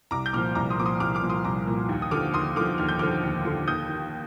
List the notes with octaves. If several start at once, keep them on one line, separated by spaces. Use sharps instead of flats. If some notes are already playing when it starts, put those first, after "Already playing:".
C2 A#5 D6
G6
A#2 F3 D6 F6
C2 A#5 D6
C6 D#6
A#2 F3 D6
C6 D#6
C2 D6 F6
D6 F6
A#2 F3
C6 D#6
C2 A#5 D6
A#2 F3
D#2
D#6
D3 F3 D6 F6
D#2 C6 D#6
D3 F3 D6 F6
D#2 F6
G6
D3 F3 D6 F6
D#2
D3 F3
D#2 D#6 G6
D#3